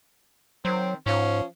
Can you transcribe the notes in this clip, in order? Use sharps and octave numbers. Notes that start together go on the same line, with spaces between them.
D#3 F#3 C4
G#2 F3 C#4